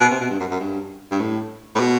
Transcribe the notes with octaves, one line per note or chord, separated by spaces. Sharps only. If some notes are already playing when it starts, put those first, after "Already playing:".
B2
C3
B2
G2
F#2
F#2
G2
G2
A2
A2
B2